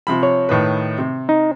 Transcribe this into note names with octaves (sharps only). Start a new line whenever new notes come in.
C3 F3 B5
C#5
A2 D#3 B4
C3
D#4